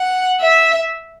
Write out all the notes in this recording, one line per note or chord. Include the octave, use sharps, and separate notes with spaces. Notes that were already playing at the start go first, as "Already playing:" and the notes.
Already playing: F#5
E5